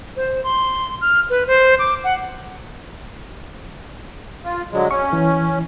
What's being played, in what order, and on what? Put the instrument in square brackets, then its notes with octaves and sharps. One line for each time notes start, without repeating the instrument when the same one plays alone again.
[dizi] C5
C6
F6
B4
C5
D6
F#5
[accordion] F4
D3 F#3 G#3
[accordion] C#4 [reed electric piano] C#6
[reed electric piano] E3